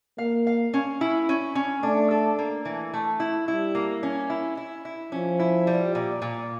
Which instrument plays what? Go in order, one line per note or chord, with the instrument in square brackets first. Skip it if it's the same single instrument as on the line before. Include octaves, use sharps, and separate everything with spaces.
[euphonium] A#3 [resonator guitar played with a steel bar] F5
[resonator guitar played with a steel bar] F5
C#4
E4
C#4
C#4
[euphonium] A3 [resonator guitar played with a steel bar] D4
[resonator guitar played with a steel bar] A4
A#3
E3
A3
E4
[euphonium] G3 [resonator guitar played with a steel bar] E4
[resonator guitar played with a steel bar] A#3
C#4
E4
E4
E4
[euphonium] F3 [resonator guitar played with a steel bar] C#4
[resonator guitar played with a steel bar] E4
G3
A#2
A#2